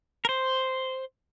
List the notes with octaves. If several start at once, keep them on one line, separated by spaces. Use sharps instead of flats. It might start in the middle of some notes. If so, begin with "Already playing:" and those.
A#4
C5